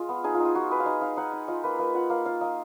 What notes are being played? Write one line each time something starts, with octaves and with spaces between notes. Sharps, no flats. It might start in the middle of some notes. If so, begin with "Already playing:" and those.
Already playing: G#3 F4 F5
B3
D#4 G#4
F4
D#4
F4
D#4 F#4
G#3 B4
F5
D#4 D#5
D#4 F5
D#4 F#5
D#4
F4 D#5
A#3 B4
A#3 B4
F4 F#5
A#3 F5
F4 F5
A#3 D#5